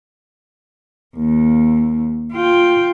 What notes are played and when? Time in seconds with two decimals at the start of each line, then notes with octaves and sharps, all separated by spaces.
1.17 D#2
2.33 F4 G5